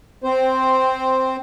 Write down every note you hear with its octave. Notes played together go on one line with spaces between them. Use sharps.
C4 C5